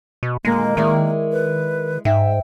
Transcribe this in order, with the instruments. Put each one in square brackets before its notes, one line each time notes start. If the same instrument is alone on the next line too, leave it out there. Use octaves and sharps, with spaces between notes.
[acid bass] B2
[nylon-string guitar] D#2 A#2 D3 [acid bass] G#3 [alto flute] A#3
[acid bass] D#3 [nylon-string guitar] G#3 E4 D5
[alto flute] B4
[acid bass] G#2 [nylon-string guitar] E5 [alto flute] G5